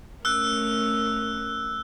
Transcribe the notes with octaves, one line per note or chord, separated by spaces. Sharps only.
A3 C#4 A#4 E6 F#6